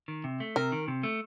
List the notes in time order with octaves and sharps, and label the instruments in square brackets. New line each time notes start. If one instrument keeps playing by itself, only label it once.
[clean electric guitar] D#3
C3
A3
[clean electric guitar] C3 [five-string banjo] A#4
[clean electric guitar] D#3
C3
A3